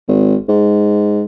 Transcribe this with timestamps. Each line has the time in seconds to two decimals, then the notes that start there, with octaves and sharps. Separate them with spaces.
0.08 G#1
0.48 G#2